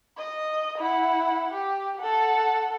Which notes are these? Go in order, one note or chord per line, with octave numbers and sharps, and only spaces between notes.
D#5
E4 F#5
G4
A4 F#5